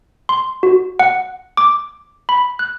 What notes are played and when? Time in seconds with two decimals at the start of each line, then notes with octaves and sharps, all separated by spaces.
0.29 C6
0.63 F#4
0.99 F#5
1.57 D6
2.29 B5
2.59 F#6